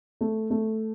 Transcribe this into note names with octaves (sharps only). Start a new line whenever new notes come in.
A3
A3